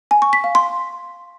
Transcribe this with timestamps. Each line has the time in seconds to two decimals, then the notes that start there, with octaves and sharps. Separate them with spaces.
0.11 G#5
0.22 C#6
0.33 B6
0.44 F5
0.55 C6